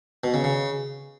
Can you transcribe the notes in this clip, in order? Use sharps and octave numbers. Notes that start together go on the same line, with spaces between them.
B2
C#3
C#3